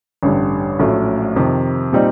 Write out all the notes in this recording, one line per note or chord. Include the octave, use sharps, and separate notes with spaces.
A1 G2 D3 G3
A#1 A2 F#3 A3 C#4
F2 C3 D#3
A#2 G3 C4 D#4